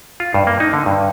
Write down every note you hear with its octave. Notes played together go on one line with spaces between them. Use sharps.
F4
G2
A#3
D#4
D3
G2